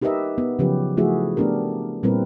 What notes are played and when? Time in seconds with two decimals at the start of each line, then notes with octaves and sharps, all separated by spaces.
0.02 D#4 G4 A#4 B4 D#5 E5
0.38 B3
0.59 C#3 F3 F#3 C#4 G4 B4
0.97 F3 A3 E4 F#4 G#4 E5
1.37 A3 B3 D4 G4 A#4
2.03 A#2 G3 C4 E4 A#4 B4